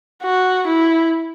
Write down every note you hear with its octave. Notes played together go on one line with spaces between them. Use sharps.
F#4
E4